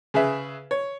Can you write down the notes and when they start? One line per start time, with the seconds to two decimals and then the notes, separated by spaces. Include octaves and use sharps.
0.14 C#3 G#4 B4 E5
0.71 C#5